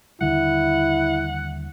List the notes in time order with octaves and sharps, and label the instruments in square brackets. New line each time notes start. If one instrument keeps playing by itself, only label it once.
[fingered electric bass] D#2 D3 G3 [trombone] E4 [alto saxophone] F#5